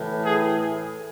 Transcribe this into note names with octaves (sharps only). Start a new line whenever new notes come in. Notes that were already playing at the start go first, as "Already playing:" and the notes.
Already playing: A2 E3
G#4